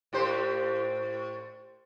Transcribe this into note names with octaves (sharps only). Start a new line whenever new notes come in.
A2 G4 C5